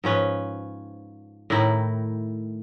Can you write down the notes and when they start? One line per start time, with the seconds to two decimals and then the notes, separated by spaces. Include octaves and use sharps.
0.04 G#2 F3 C#4 B4
1.50 A2 D#3 D#4 E4